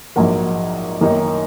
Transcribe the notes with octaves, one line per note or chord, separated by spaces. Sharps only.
A#1 G#2 F#3 A#3
F#2 D#3 A#3 D#4